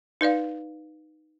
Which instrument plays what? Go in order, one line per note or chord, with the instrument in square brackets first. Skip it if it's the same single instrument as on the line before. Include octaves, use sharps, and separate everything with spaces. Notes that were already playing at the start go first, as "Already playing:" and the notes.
[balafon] D#4 B4 D5 F5